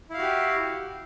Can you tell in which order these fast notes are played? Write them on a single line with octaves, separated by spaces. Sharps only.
E4 F5 F#4 G4